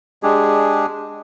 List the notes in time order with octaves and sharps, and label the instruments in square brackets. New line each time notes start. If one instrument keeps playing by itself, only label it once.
[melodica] G#3 D4 G4 G#4